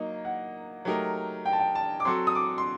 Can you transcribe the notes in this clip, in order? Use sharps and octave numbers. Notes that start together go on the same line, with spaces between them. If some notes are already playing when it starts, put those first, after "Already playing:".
Already playing: F#3 A#3 D#4 D#5
F#5
F#3 A3 D#4 G4 A#4
G5
A5
G5
A5
D6
F#3 C4 F#4 A4 C6
D#6
D6
C6